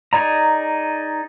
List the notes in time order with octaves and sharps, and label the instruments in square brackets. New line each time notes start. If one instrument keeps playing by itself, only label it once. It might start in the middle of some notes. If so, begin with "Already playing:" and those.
[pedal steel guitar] D#4 G#4 D5 A#5